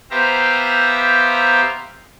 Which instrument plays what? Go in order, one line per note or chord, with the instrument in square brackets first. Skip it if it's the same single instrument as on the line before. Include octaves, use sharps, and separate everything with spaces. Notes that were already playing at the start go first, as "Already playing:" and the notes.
[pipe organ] B3 G4 C5 E5 F5 A#5